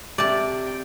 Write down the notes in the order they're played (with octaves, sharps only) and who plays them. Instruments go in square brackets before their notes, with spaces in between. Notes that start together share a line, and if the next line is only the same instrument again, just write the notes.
[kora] C3 [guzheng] D5 A5
[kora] G5